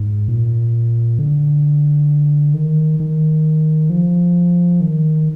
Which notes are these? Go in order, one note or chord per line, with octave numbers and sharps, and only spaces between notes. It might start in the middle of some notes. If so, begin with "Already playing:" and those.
Already playing: G#2
A#2
D3
D#3
D#3
F3
D#3